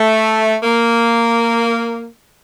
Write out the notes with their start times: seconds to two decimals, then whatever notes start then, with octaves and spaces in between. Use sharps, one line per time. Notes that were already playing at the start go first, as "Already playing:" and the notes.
Already playing: A3
0.64 A#3